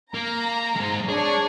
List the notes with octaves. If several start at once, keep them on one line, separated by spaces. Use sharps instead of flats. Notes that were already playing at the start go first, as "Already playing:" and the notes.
A#3 A#5
G#3 C5
D4 G#4 C#5